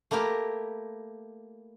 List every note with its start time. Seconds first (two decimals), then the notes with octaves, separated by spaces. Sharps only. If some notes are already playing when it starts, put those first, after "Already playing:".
0.11 A3 A#3 E4 G4 A#4